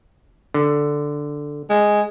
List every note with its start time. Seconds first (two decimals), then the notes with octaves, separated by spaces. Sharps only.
0.54 D3
1.70 G#3